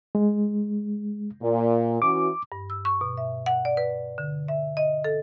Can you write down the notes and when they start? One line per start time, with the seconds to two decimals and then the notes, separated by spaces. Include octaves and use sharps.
0.15 G#3
1.41 A#2
2.02 E3 C#4 F#4 D6
2.52 G2
2.70 E6
2.85 C#6
3.01 B2
3.17 E5
3.46 F#5
3.65 D5
3.77 B4
4.18 D3
4.48 E5
4.77 D#5
5.04 A4